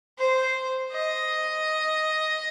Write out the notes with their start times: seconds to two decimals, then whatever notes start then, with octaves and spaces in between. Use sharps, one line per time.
0.19 C5
0.93 D#5